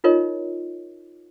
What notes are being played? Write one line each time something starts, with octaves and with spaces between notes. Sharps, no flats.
D#4 F4 A#4 C#5 D#5